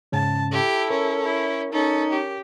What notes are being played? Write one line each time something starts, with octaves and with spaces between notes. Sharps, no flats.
G#2 C#3 C#4 A5
E4 G4 A4
C#4 A#4
E4
C#4 D#4 A4
G4